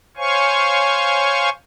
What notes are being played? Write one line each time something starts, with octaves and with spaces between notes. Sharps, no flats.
C5 C#5 F5 G#5 C#6